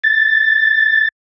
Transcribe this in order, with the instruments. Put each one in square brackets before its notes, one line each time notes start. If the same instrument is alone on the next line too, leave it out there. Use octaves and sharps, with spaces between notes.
[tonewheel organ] A6